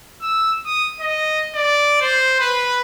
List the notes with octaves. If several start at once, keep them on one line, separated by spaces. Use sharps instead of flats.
E6
D#6
D#5
D5
C5
B4